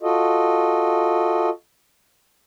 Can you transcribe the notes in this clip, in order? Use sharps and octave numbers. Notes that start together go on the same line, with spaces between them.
F4 F#4 A4 D#5